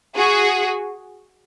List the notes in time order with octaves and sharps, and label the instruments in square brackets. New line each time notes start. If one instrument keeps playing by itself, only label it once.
[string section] F#4 G#4